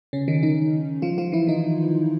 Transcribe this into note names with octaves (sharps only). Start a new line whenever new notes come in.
C#3 C#4
D#3 D#4
D#3 D#4
F3 F4
F3 F4
E3 E4
D#3 D#4